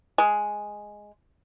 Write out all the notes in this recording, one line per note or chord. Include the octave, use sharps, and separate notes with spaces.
G#3